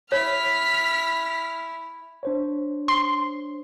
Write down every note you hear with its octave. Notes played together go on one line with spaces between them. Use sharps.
E4 C#5 F6 B6
D4 C5 C#5
C6